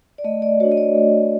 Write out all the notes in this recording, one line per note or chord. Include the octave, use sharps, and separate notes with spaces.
D5
A3 D#5
D5
D4 F#4 C#5
D#5
D5
A3